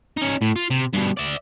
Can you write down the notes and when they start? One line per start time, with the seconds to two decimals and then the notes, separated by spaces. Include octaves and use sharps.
0.17 C#4 D#4
0.42 A2
0.56 F4
0.71 C3
0.93 G2 B2
1.17 D5 E5